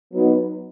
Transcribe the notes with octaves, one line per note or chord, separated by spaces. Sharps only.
F#3 B3 D#4